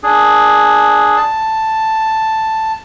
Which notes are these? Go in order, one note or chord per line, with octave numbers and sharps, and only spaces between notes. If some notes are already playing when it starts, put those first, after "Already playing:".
D4 G#4
A5